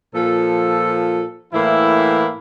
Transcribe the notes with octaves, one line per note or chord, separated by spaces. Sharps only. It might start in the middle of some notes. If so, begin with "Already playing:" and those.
A#2 F3 A4
A2 E3 A#3 E4